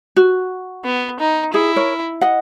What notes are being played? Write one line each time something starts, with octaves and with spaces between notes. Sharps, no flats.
F#4
B3
D#4
E4 G#4
A#4 C#5
D#5 F#5